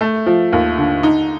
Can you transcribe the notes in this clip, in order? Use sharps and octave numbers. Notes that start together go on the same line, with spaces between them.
A3
F3
D#2
D3
D#4